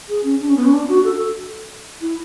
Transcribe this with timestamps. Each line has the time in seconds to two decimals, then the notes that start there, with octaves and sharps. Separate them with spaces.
0.09 G#4
0.24 C#4
0.40 D4
0.48 C#4
0.56 B3
0.65 C#4
0.72 D4
0.89 F#4
1.04 A4
2.01 E4